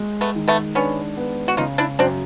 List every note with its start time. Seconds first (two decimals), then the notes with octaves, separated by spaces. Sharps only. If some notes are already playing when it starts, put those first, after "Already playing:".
Already playing: G#3
0.21 A3 B3
0.35 D#3
0.48 A3 B3
0.75 B3 C#4 D4
1.16 B3
1.48 F#4
1.57 C#3 D#4 F4
1.78 D4 E4
1.99 F#2 C4 D4